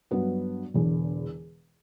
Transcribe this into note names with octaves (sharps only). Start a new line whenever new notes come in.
G2 F#3 B3 F#4
E1 E2 D3